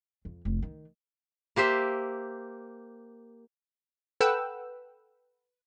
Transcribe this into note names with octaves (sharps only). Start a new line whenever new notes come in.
F2
F1
D#3
A#3 G4 C5 E5
A4 B4 F#5 G5 E6